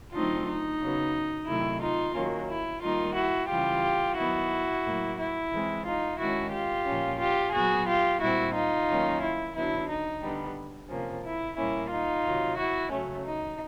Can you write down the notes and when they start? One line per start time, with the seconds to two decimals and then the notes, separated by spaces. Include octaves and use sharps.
0.13 D3 F#3 A3 C4 D#4 F4
0.47 D#4
0.80 C#3 F#3 B3
1.48 C3 D#3 F#3 A3 E4
1.81 D#4 F4
2.15 D#3 F#3 A#3 C#4
2.49 E4
2.82 D#3 G3 A#3 D#4 F4
3.16 E4 F#4
3.49 C#3 E3 G3 F4 G4
4.17 D#3 F#3 B3 E4 F#4
4.85 A2 F#3 A#3
5.19 E4
5.52 E3 G#3 C4
5.85 D#4 F4
6.19 D#3 G#3 C#4 E4 F#4
6.52 F4 G4
6.86 A#2 F3 A#3 C#4
7.19 F4 G4
7.53 A#2 F#3 B3 F#4 G#4
7.87 F4 G4
8.20 A#2 G3 C4 E4 F#4
8.54 D#4 F4
8.89 D#3 F#3 A#3 C#4
9.22 E4
9.55 D3 F#3 B3 E4
9.88 D#4
10.22 D3 G3 B3
10.89 C3 F3 A#3 C#4
11.24 E4
11.57 A#2 G3 A#3 C#4 E4
11.90 D#4 F4
12.25 C3 D#3 F#3
12.58 E4 F#4
12.91 C#3 F#3 A3 C#4
13.26 D#4